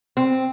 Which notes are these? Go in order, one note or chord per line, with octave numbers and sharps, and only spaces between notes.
C4